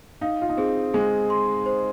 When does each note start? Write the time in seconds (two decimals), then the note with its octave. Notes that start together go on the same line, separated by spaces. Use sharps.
0.21 D#4 F5
0.42 F4
0.49 D#4
0.57 C4 G#4
0.94 G#3 G#4
1.30 C6
1.66 C5